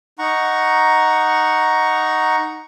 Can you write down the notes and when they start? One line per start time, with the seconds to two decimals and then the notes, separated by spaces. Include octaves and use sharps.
0.19 D#4 F#5 A#5 C#6